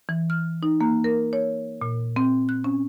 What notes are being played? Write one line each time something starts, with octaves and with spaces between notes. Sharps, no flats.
E3
F6
D#4
A#3
A#4
C#5
A#2
C4
F#6
C#4